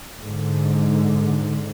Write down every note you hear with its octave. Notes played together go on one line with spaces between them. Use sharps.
G#2 D3